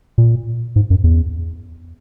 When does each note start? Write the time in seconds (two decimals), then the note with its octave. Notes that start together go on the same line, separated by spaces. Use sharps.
0.18 A#2
0.76 G#2
0.90 F#2
1.04 E2